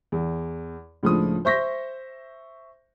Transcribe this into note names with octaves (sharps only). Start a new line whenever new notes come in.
E2
C#2 A2 F3 D4 D#6
C5 E5 C#6 G6 A#6 B6